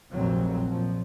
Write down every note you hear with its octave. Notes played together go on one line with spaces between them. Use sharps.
F1 A#1 F2 A#2 F#3 C4
A#1 F3